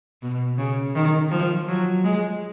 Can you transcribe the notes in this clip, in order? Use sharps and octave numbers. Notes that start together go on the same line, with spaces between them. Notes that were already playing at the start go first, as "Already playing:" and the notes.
B2
C#3
D#3
F3
F#3
G#3